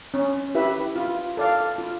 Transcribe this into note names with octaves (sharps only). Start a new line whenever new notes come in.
C#4
E4 G4 B4 E5
F4
A4 D5 F5
F4